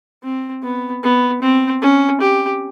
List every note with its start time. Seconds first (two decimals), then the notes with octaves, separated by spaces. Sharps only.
0.24 C4
0.64 B3
1.04 B3
1.42 C4
1.82 C#4
2.21 G4